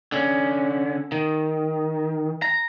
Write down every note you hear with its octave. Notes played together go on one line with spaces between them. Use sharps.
D3 C#4
D#3
A#5